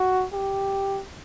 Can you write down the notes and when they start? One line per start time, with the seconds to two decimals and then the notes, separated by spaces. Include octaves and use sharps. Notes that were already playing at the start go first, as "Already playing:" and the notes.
Already playing: F#4
0.33 G4